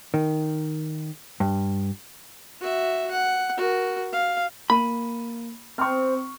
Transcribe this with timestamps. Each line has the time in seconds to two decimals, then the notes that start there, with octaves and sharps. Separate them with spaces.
0.14 D#3
1.40 G2
2.60 F#4 E5
3.12 F#5
3.57 F#4 A#4
4.13 F5
4.70 A#3 B5 D#7
5.78 C4 C#6 F6